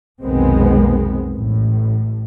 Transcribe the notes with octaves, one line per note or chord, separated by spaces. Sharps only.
F1 B1 D#3 G#3 B3 C4
A1 A2